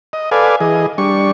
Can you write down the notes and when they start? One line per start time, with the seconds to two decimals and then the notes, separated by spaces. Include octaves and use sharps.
0.13 D#5
0.31 A4 B4 D5 F5 G#5
0.60 E3 G#4 D#5
0.98 G3 D4 C#6